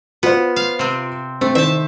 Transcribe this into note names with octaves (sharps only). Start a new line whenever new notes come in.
B3 F4 C5
F5
C3 C4
A3 C4
D#3 C5 E5 A5